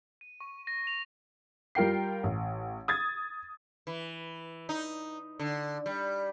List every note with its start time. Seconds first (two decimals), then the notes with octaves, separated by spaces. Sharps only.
0.21 D#7
0.40 C#6
0.67 A#6
0.87 F7
1.75 G3 F4 A#4 G5 C7
2.23 A1
2.88 D#6 G#6 A6
3.87 E3
4.69 D#4
5.39 D3
5.86 G3